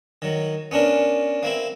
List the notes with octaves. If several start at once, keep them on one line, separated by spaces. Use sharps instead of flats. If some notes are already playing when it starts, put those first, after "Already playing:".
D#3 F#3
B3 C#4 D4 A#4
A#3 C4 E4